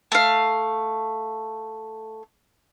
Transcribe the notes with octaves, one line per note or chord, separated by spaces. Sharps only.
A3 F5